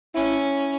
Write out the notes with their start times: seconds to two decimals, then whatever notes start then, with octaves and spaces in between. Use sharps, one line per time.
0.15 C#4 E4